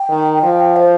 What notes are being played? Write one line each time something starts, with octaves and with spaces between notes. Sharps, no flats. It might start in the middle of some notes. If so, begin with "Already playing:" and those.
Already playing: G5
D#3
F3
C5